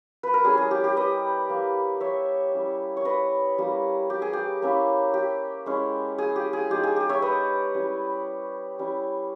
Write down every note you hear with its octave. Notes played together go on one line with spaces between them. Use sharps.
B4
A#4
G3 C#4 E4 G#4
G#4
G4
G4
B4 D#5
A#3 E4
C#5 E5
G3 C#4 E4
C#5
B4 D#5
G3 A#3 C#4 E4
G4
G#4
G4
A#3 C#4 E4
G4
G#3 C#4 E4
G#4
G4
G#4
G#3 D#4 G4
G#4
G4
C#5 E5
B4 D#5
G3 C#4 E4
G3 C#4 E4